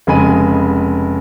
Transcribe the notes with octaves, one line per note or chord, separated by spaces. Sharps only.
F1 C#3 G#3 G#5 B5 D#7